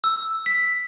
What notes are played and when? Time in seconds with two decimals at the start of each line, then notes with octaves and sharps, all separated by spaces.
0.04 E6
0.46 B6